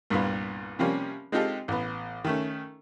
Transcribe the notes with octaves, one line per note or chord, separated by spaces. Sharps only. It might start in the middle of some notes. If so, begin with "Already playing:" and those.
C2 G2 A#2 B3
C3 F3 G3 A#3 C#4
G#3 C4 D#4 F4 G4 A4
A1 B3
D#3 A3 C#4